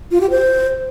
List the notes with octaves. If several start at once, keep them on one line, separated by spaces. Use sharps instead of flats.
F4
G4
C5